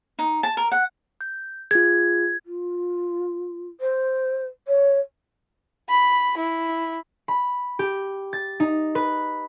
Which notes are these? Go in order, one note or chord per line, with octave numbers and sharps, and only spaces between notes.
D#4
A5
A#4
F#5
G6
F4 G#4 G#6
F4
C5
C#5
B5
E4
B5
G4
A6
D#4
B4